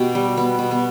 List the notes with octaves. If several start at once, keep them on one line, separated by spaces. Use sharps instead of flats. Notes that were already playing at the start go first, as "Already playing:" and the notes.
Already playing: B2 B3 G4
G3
B3
B2
B3